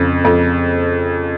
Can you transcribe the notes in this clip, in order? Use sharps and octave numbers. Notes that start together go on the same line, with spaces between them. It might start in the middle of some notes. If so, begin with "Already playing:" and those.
Already playing: F2 C#3
F2